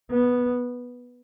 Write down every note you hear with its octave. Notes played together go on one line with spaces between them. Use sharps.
B3